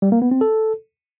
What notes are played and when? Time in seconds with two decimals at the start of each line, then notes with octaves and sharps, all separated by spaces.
0.02 G3
0.12 A#3
0.22 B3
0.31 C4
0.41 A4